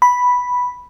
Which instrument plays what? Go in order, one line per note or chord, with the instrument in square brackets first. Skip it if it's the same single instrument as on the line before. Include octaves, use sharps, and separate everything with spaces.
[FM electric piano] B5